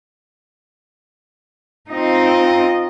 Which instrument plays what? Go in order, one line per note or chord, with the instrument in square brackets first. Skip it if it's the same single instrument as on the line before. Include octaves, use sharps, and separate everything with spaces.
[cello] C4 D#4 [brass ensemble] F4 D#5